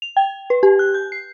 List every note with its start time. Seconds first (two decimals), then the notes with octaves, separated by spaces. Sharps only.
0.02 F7
0.17 G5
0.50 B4
0.63 G4
0.79 F#6
0.94 G6
1.12 C7